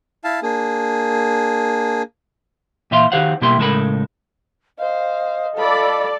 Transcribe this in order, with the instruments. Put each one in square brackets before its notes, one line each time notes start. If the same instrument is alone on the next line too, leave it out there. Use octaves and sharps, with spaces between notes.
[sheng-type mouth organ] E4 F5 A5
A#3 D4 G#4
[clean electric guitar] A#2 E3 E5 F5 C6
D#3 F#4 G4 C5 F5 F#5
B2 G3 A#3 E4 G4 C6
A2 C#3 G#3 A4 A#4 B5
[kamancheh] C5 F5 [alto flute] D#5
[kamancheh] F4 B5 [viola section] A4 D5